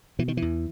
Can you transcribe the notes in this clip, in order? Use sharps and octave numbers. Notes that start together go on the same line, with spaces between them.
B2 E3
D#3
E2 E3